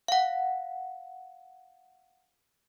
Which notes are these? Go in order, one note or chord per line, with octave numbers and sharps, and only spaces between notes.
F5 F#5